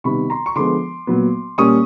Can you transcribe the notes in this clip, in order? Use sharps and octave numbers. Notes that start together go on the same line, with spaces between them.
C3 D#3 G3 B3 B5 C#6
A#5 C6
C#6
D3 F3 G#3 B3 C6 D6
A#2 F#3 B3
A#2 G3 A#3 C#4 C#6 D#6